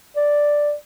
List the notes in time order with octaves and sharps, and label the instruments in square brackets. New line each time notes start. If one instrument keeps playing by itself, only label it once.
[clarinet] D5